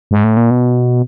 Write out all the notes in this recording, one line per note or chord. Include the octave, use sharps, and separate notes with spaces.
G#2
A2
A#2
B2